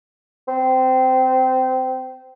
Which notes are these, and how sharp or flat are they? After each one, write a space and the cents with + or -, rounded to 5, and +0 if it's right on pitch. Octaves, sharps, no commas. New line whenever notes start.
C4 -20